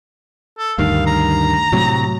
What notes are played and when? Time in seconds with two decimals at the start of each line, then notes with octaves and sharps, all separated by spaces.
0.58 A4
0.78 D2 G2 D#3 F5
1.07 A#5
1.72 A2 C3 F#3